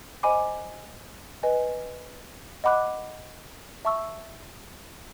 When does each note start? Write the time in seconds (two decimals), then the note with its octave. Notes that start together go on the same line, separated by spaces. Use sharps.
0.23 C5 D#5 G#5 B5 D6
1.43 B4 D#5 G#5
2.64 D#5 F#5 B5 D6 F#6
3.85 E5 A5 C#6 E6